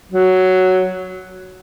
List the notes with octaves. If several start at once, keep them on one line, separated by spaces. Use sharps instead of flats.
F#3